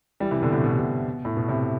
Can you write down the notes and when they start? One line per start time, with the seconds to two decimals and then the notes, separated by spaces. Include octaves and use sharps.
0.20 E3 G3
0.31 C3 E3
0.42 B2 D3
0.52 A2 C3
0.64 B2
0.71 C3
0.79 B2
1.25 A2
1.37 B2
1.48 A2 C3